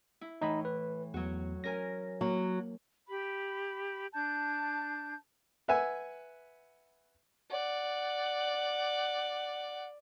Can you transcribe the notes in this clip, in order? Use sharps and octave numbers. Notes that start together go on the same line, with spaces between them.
E4
A2 E3 D#4 D#5 B5
B4
E2 F#3 F#4
C#4 A#4 G#5 A#6
F#3 A#3
G4 B5
D4 A5 G6
B4 E5 F#5 G#5
D5 F#5